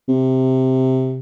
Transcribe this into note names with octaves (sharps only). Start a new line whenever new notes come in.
C3